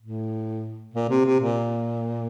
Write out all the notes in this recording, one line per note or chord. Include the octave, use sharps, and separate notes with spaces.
A2
A#2
C3
C3
A#2